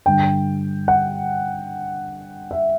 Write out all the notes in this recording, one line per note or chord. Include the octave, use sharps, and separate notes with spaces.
G2 D3 G5
F#5
E5